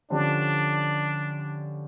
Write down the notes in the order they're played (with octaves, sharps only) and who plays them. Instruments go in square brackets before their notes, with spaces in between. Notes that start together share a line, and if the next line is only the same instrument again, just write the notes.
[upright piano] D3 F3 C#4 G4 [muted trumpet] D4